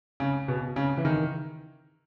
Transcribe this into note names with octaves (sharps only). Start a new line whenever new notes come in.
C#3
B2
C#3
E3
D#3